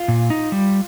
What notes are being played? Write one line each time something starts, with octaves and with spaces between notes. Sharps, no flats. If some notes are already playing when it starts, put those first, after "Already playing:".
Already playing: F4
A#2
D#4
G3